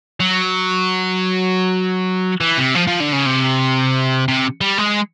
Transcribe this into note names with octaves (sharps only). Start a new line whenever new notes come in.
F#3
E3
C3
F3
F3
D3
C#3
C3
C3
G3
G#3